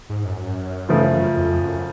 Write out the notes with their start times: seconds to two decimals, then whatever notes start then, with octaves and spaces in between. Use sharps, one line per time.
0.09 G#2
0.25 F#2
0.89 C#3 F3 A3 F4
1.37 F2
1.61 F#2